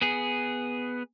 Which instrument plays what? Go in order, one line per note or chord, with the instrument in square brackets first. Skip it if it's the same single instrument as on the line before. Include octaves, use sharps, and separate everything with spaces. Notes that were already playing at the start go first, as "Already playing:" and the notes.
[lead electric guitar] B3 G#4